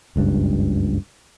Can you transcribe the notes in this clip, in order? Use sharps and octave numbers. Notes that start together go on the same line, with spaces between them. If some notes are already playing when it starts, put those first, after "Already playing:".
F#1 C#2 G2